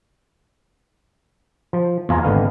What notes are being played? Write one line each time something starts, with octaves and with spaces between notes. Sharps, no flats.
F3
E2 F4 G#4 A#5
G#1 D3 B3 F5